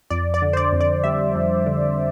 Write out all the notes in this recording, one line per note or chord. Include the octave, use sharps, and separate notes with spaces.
F2 D5
D5
D3
C5
D5
F2
D5
G3 E5
F2
D3